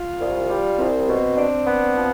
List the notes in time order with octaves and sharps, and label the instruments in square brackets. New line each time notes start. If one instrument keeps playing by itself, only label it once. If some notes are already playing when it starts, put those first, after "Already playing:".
Already playing: [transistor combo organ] F4
[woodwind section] C2
G3
[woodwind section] C2 [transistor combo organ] C4
[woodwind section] B2
D4
B3
F3